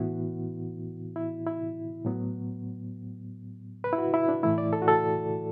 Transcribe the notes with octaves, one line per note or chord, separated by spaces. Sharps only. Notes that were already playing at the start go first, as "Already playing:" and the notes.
Already playing: A2 E3 B3 E4 F#4
E4
E4
A2 F#3 B3
B4
E4
F#4
E4
D4
A2 E3 A3 E4
D5
A4
F#4
A4